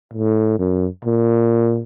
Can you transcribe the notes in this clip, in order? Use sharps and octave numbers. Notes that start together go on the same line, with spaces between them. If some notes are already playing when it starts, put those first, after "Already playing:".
A2
F#2
A#2